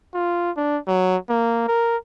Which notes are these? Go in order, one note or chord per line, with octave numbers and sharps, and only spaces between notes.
F4
D4
F#3
A#3
A#4